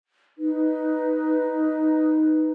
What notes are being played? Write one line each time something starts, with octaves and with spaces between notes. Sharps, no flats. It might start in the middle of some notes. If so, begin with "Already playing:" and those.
D#4 B4